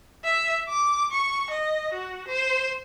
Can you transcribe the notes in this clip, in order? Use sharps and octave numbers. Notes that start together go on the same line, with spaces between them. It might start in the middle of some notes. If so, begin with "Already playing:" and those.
E5
D6
C#6
D#5
F#4
C5